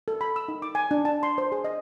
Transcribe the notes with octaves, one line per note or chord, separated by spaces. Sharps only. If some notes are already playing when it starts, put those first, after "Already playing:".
A4
B5
E6
D#4
D6
G#5
D4
A5
C6
C5
G#4
D#5